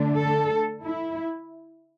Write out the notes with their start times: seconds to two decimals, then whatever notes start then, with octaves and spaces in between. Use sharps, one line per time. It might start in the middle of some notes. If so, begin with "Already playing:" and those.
Already playing: D3 A3 D4
0.17 A4
0.83 E4